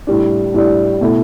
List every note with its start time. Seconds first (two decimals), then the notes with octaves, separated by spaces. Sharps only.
0.07 A2 G3 D4
0.54 A2 G3 D4
1.01 B2 A3 E4